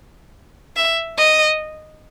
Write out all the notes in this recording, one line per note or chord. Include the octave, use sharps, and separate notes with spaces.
E5
D#5